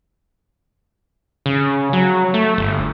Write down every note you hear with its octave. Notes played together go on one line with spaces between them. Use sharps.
C#3
F#3
A3
G1